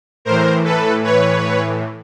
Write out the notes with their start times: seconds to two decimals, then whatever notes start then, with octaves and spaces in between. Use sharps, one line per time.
0.25 A2 E3 A#4 C5
0.64 A4 B4
1.04 B4 C#5